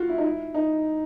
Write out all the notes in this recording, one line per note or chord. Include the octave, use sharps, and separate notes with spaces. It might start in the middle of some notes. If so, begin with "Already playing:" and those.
Already playing: F4 F#4
E4
D#4
E4
D#4